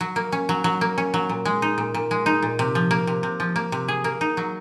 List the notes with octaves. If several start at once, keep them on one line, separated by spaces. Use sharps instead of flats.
F#3
A#3
C#4
F#3
F#3
A#3
C#4
F#3
A#2
G#3
D#4
A#2
A#2
G#3
D#4
A#2
C3
F3
A#3
C3
C3
F3
A#3
C3
G#4
A#3
D#4
F#3